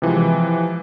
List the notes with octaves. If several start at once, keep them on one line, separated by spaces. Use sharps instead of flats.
C3 E3 F3 G#3